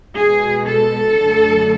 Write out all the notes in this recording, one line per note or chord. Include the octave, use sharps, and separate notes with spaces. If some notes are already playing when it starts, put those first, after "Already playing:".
B2 G#3 G#4
A4
F#2 D3 F#3 A3